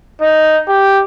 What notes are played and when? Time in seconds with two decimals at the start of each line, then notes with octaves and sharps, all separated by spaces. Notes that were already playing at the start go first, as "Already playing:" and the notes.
0.21 D#4
0.68 G4